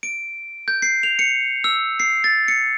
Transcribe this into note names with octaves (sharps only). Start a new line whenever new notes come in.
D7
G6
C7
F7
C#7
E6
C7
A6
C#7